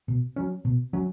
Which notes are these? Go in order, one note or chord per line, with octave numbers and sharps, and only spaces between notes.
B2
F#3 C#4
B2
F#3 C#4